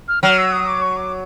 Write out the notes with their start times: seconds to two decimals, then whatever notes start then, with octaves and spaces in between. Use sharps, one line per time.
0.08 F6
0.23 F#3 F6
0.38 E6
0.52 D#6
0.68 D6
0.82 C#6
0.97 D6